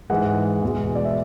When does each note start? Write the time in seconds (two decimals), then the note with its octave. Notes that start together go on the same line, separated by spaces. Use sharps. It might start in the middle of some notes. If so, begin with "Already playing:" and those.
0.10 G#2 E3 G#3 F#5
0.62 E2 B2 G#3
0.95 D5
1.05 E5